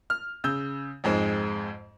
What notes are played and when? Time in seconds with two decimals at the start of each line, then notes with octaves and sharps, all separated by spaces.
0.10 F6
0.44 C#3 E6 G6
1.04 F2 G#2 G#3 C4